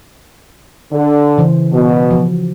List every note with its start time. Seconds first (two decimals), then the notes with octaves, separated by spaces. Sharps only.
0.92 D3
1.38 C#3 E3 C5
1.72 B2
2.11 F3 F#4